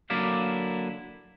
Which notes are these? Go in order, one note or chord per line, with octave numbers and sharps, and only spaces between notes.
D3 F#3 A#3 E4 D5 F5